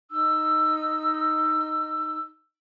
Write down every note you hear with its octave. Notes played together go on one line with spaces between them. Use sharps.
D#4 E6